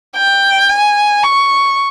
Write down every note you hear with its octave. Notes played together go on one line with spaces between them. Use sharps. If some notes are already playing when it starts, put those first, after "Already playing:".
G5
G#5
C#6